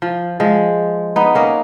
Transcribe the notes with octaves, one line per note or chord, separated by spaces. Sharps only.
F3
F3 G#3
B3 D#4
A#3 C#4